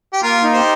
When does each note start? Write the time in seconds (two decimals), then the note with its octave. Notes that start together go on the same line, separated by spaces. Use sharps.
0.13 G4
0.23 A#3 F4 A#4
0.43 D#4
0.53 G4 C5